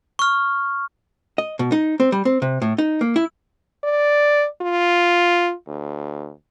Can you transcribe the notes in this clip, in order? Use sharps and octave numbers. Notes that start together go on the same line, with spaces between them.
C#6 F6
D#5
B2
D#4
C4
G3
C4
C3
A2
D#4
A#3
E4
D5
F4
D2